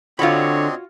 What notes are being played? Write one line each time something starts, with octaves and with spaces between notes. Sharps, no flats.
D3 C4 D4 F4 F#4 C#5 D#5 B5